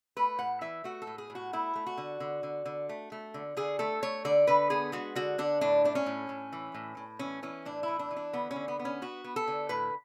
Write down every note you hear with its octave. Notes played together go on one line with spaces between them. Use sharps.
A3 B4
A2 F#5
E3 E5
A3 F#4
A4
A2
G#4
A2
F#4
A3 E4
A3
F#4
D3
D3
D3
D3
A3
A3
D3
D3 G#4
A3 A4
A3 C#5
D3 D5
D3 B4
B3 G#4
G#3 F#4
D3 F#4
D3 D4
A2 D4
A3 D4
C#4
A2
A2
E3
A2
A2
E3 C#4
E3 C#4
A2 D4
E3 E4
D4
E3
D4
D3 B3
C#4
D3
B3
B3
C#4
B3 F#4
B3
A4
D3
A2 B4